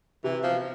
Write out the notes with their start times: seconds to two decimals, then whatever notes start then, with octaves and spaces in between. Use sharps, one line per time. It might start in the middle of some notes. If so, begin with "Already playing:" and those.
0.24 C3 E3
0.43 B2 F3